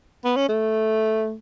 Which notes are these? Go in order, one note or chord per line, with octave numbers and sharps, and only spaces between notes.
B3
C#4
A3